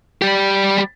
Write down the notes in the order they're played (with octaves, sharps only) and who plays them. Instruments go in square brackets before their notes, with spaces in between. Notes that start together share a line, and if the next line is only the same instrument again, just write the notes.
[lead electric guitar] G3 G4